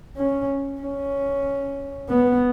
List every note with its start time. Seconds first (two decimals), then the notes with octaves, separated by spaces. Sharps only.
0.17 C#4
0.81 C#4
2.09 B3